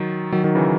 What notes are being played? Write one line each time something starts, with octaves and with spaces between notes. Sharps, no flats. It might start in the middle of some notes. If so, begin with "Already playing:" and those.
Already playing: D#3 F#3
D#3 F#3
D#3 F#3
C#3 E3